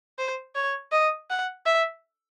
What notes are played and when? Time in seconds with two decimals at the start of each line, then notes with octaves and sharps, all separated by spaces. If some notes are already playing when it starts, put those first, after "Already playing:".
0.19 C5
0.56 C#5
0.92 D#5
1.30 F#5
1.66 E5